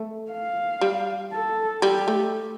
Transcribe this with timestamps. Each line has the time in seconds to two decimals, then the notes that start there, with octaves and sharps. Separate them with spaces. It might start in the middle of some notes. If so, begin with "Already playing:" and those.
Already playing: A3
0.31 F5
0.81 G3
1.32 A4
1.82 G3 G4
2.08 A3